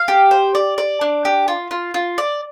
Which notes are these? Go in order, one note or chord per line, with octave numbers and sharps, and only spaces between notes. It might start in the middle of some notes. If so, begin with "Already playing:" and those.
Already playing: F5
G4
C5
D5
D5
D4
G4
F4
F4
F4
D5